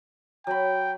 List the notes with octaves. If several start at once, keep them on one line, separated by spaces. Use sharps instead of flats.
F#3 G5 B5